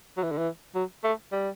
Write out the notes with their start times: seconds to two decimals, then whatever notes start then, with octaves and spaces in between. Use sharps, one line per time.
0.17 F#3
0.23 E3
0.31 D3
0.37 E3
0.75 F#3
1.03 A3
1.32 G3